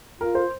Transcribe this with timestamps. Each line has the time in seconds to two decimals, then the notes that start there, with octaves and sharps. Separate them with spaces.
0.21 F4 A#4
0.35 C5